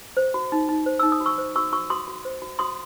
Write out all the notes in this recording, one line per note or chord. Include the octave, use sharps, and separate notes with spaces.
C5
F#4
D#4
D#4
C5
D#4 E6
D#6
F#4
C#6 E6
C5
F#4 C#6 E6
F#4 C#6 E6
F#4 C6 D#6
F#4
C5
F#4
F#4 C6 D#6